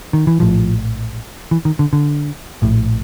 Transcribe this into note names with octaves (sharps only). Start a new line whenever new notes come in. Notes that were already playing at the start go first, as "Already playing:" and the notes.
D#3
E3
A#1 A2 F3
E3
D#3
D3
D3
A#1 A2